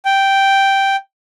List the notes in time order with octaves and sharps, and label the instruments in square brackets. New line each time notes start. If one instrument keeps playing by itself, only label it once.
[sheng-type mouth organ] G5